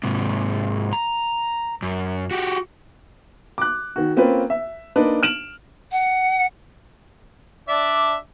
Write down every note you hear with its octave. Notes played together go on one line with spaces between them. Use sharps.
G#2 C3
A#5
F#2
F#4 G4
D6 F#6
D#3 F#4
A#3 C4 C#4 F4 B4
E5
A#3 D4 D#4 B4
F6 D7 E7 F#7
F#5
D4 D5 E5